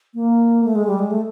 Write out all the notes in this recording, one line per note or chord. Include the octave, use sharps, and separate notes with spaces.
A#3
A3
G#3
G3
G#3
A3